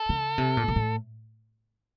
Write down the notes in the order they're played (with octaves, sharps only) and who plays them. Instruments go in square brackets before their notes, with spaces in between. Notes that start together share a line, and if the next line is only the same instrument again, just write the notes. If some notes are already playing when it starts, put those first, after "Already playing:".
Already playing: [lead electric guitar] A4
[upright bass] C#3
C3
A#2
A#2
A2